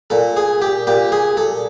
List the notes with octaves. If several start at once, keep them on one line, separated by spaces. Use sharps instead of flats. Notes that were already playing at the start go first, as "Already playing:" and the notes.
A#2 A4
G#4
G4
A#2 G4
G#4
A4